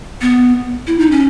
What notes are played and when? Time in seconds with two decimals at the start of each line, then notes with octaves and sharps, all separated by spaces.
0.21 B3
0.87 E4
0.99 D#4
1.11 C#4